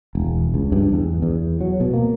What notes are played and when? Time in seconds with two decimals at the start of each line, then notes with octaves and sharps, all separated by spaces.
0.15 E1
0.54 C#2
0.72 G2
0.93 E2
1.22 E2
1.61 F#3
1.80 B2
1.94 A#3